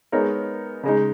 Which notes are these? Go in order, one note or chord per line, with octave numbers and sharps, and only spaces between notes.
G#3 B3 D#4 A#4 C#5
C#3 G#3 D#4